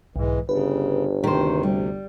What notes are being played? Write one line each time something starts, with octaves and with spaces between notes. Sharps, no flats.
B1 G#2 E3 G#3
G1 C#3 B4
D2 C3 D#3 C5
G3